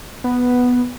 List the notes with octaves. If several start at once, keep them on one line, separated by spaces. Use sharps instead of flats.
B3